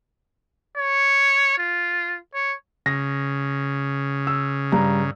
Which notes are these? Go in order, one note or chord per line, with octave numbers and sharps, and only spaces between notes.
C#5
F4
C#5
C#3 A#6
E6
G2 A#5